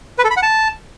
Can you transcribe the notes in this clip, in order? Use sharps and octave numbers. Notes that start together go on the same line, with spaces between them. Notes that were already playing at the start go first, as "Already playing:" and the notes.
B4
A4
B5
F#5
A5